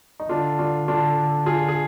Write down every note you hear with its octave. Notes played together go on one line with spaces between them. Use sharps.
D#4
D3 D4 F4
D4 F4
D4 F4
F4 G#4
G#4